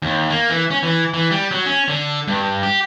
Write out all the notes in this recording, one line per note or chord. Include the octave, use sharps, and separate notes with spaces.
D#2
A#3
E3
C#4
E3
E3
G3
F#3
C#4
D3
G2
G4